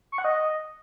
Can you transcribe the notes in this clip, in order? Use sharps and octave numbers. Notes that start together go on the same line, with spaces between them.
C#6
F#5
D#5